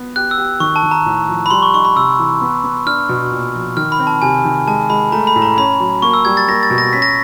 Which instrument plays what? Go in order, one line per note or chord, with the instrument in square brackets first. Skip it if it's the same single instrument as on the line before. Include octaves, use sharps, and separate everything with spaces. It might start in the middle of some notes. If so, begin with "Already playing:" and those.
Already playing: [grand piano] B3
[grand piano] G4 [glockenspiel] F#6
[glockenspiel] E6
[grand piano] G4
[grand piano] D#3 [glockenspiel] C#6
[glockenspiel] A5
[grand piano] D#3
[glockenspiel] A#5
[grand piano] A2
F3
[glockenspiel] B5
[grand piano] G3 [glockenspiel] C6
[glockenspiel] C#6
[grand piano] D#4 [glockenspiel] C#6
[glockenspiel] B5
[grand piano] C3 [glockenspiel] E6
[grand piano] E3
B3
B3
[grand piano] D4 [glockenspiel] F6
[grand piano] B2
A#2
F3
[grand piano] D#3 [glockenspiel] F6
[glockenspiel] B5
[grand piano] C4
[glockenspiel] A5
[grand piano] C3 [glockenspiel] G#5
[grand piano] D#3
[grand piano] G#3 [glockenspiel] A5
[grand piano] G#3 [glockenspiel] B5
[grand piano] A3 [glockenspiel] A#5
[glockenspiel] B5
[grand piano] A2
[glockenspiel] A#5
[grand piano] C#4 [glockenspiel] B5
[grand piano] F#3
[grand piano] A#3 [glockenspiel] C#6
[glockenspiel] E6
[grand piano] G3 [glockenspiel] G#6
[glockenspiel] A6
[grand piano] A#3 [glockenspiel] A#6
[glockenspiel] A6
[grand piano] B2
[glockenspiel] A#6
[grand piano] C#4 [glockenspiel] B6
[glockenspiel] A#6